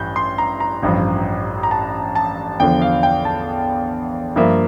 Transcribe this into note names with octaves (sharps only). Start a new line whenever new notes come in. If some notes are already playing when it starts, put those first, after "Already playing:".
Already playing: A1 G2 E3 G6
C6
A#5
A#5
A1 G2 F3
A#5
A5
A5
E2 D3 F3 G5
F5
G5
A5
G2 F3 A#3 E5